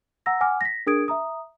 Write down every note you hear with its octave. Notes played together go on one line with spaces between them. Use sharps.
F#5 A#5 E6 A#6
F#5 G#5 D6 F6
A#6 B6
D4 G#4 A#4 D#6 G#6 D7
E5 A#5 D#6